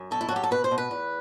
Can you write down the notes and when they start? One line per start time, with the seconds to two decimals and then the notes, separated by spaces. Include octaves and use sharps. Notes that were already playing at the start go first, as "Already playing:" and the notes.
Already playing: F#2
0.11 B2 A4
0.21 E4
0.29 F#4
0.31 F#3 G4
0.43 A4
0.51 B2 B4
0.64 C5
0.71 B2
0.78 B4
0.91 E2